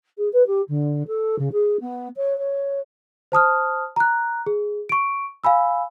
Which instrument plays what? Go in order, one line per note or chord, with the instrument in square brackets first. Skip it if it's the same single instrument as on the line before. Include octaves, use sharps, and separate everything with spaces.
[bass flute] G#4
B4
G4
D3
A4
C#3
G#4
B3
C#5
C#5
[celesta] C5 A5 D#6 F6
A#5 F#6
G#4
C#6 D7
F5 G#5 B5 E6